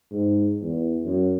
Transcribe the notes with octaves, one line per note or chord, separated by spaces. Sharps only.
G#2
E2
F#2